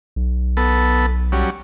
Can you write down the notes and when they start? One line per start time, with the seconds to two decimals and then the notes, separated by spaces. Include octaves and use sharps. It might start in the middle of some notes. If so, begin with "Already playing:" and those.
0.16 B1
0.57 B3 A4
1.32 F#3 G3 C#4